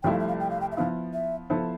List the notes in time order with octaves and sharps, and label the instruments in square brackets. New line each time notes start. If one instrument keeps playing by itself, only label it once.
[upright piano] C2 C3 F3 A3 E4 [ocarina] G5
[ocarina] F5
E5
F5
G5
F5
G5
E5
[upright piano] F3 B3 E4 [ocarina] F5
[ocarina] E5
[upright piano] F3 B3 E4 A4 C5